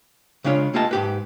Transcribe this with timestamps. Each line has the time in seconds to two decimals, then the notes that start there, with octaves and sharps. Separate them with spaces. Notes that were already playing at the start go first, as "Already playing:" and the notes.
0.44 C#3 G#3 D4 F4 C#5
0.74 A3 A#3 F4 G4 D#5 A5
0.91 G#2 G4 B4